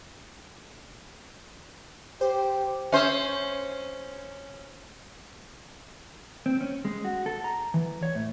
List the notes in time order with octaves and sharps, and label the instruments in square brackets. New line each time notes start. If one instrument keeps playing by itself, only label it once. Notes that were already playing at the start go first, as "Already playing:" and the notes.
[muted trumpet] G4 [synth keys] C5
[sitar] C#4 C5 [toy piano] E5 E6
[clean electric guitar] C4
C#4
G#3
F#4
A4
A#5
E3
C#5
A2